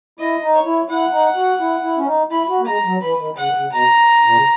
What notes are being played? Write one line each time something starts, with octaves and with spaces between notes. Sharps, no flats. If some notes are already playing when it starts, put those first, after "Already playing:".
E4 D#5
D#4
C#5
E4
E4 F#5
D#4
F#4
E4
E4
C#4
D#4
E4 B5
F#4
A#3
G#3 A#5
F#3
E3 B5
D#3
C#3 F#5
D#3
C#3
B2 A#5
A#2
C#3